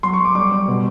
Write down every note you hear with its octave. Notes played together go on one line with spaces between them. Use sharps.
F#3 C6
C#6
F#3 D6
G3 D6
G3
B2